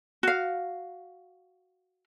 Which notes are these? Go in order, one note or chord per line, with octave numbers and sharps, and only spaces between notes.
F#4 F5